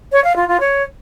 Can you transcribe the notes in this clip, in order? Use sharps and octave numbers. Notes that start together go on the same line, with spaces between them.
C#5
F5
F4
F4
C#5